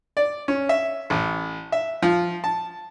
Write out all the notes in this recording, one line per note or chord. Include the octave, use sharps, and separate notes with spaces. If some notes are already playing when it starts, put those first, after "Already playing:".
D5
C#4
E5
A1
E5
F3
A5